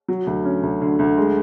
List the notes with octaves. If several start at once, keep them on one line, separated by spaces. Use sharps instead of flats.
F#3
D2
C#4
D2
D3
D2
G#3